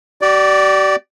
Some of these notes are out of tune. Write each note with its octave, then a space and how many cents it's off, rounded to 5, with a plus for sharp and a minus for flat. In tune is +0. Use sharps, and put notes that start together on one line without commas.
G4 -45 D5 +0